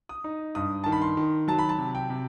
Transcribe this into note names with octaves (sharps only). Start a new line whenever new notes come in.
D#6
D#4
G2 D#6
D#3 A5
B5
C6
D#3
F#3 A5
B5
A5
C3
G5
C3